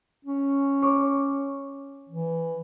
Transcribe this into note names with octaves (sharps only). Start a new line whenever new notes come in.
C#4
C#5 C#6 D6
E3